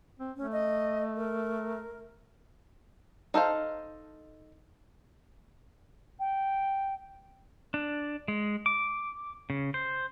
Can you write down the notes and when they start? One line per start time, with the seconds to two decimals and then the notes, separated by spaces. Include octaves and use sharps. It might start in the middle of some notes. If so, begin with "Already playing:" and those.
0.19 C4
0.37 A3 C#4
0.52 D#5
1.16 A#4
3.34 D#4 A4 C5 F5
6.19 G5
7.74 D4
8.28 G#3
8.66 D6
9.50 C#3
9.74 C5